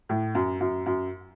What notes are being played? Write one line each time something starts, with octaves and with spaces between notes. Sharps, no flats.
A2
F#2
F#2
F#2